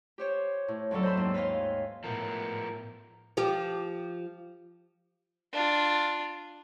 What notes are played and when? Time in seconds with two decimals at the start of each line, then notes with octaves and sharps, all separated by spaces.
0.18 G4 C5 C#5
0.68 A2
0.91 F2 D3 F#3 C#4 A4
1.03 C5 D#5 A5 B5 C6
1.17 D#2 G#2
1.34 B4 C#5 D#5 F5 C6
2.04 A2 F3 B3 A#4
3.37 F3 G4
5.53 D4 F4